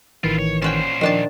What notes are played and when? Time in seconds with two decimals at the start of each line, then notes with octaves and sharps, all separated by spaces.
0.24 A1 D#3 E3 E4 F4
0.39 C#5
0.62 A#2 C#4 F#4 C5 G5
1.01 D#3 F3 D4 A5